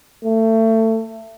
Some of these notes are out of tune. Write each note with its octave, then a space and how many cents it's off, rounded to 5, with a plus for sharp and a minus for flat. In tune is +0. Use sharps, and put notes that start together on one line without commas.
A3 +25